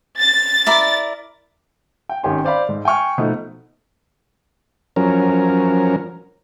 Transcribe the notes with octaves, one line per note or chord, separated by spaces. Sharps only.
A6
E4 A#4 D5
G5
G#1 D#3 C#4 G4 G#5 C6
C5 D5 F5 B5
G#2
G5 G#5 C#6 F6
B2 F3 A3 D#4
F3 F#3 C#4 A#4